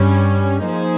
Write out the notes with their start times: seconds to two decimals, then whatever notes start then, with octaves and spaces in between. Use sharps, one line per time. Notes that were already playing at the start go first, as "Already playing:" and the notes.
Already playing: G2 G3 C#4
0.63 F3 A#3 D#4 G#4 C5